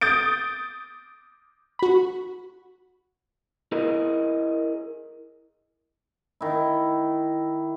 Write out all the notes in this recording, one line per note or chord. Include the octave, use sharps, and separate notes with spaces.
D#6 G6 A6 D7
F#4 B5
E4 G#4 A#4 D#5
D#3 E4